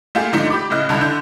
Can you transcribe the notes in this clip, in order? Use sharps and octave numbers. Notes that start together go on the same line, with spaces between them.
A3 A#3 F4 G4 G#4
G#2 D3 F3 A3 D4 D#4
G4 B5 D6
A2 C#3 E4 D#5 F#6
C2 D3 A5 B5
D3 G6